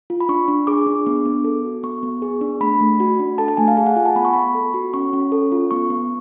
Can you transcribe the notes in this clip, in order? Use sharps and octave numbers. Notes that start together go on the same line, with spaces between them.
F4
B5
D4 C#6
D4
G#4 D6
D4
B3
B3
A4
F#4
B3 C#6
B3
G#4
D4
A3 B5
A3
F#4
D4
A4 A5
A5
A3 G#5
F5
G#4 A5
F#5
F4 G#5
A5
B3 B5
C#6
B3 B5
A4
F#4
C#4 C#6
C#4
A4
F4
B3 C#6
B3